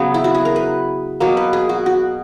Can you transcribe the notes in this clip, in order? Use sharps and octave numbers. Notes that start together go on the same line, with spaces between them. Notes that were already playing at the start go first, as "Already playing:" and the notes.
Already playing: C#3 F#3 B3 C#5
E4
F#4
G#4
A#4
B4
B2 F#3 A#3 C#5
B4
G#4
F#4
F#4